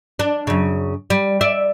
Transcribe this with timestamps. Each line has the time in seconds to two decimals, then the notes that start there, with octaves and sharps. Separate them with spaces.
0.19 D4
0.47 F#2 C#3
1.10 G3
1.41 D5 E5